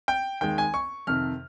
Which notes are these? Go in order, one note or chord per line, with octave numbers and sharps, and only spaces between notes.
G5
D#2 D#3 G#3 G5
G#5
C#6
F2 C3 D#3 F6